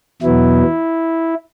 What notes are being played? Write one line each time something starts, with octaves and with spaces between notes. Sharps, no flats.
E2 B2 F#3 B3 E4